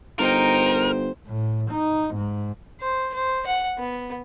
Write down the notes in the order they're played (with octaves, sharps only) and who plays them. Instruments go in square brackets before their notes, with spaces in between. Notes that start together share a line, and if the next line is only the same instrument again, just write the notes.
[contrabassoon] G1 [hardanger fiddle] D#4 G5 [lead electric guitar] A#4 [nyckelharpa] C5
[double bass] A2
D#4
G#2
[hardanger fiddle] C5
C5
F#5
B3